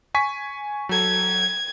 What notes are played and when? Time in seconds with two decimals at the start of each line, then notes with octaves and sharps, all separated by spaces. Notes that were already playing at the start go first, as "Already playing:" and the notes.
0.15 G#5 C#6 B6
0.89 F#3 A4 G#6